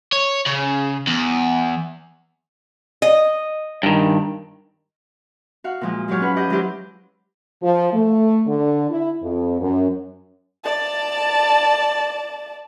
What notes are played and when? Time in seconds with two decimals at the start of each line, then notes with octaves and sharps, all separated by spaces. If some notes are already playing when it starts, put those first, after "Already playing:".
0.12 C#5
0.46 C#3
1.07 E2
3.02 D#5
3.83 G2 D#3
5.64 F#4 F5 F#5
5.81 A#2 F3 G#3
6.08 G#2 F#3 G4 C#5 F6
6.21 C#4 B4 F#5
6.36 G4 D#5 F#5 G6
6.50 F#3 G#3 E4 F4 G4 C5
7.61 F3
7.93 A3
8.46 D3
8.90 E4
9.22 F2
9.60 F#2
10.64 D5 A5